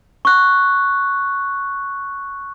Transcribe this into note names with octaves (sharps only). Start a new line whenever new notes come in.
C#6 F#6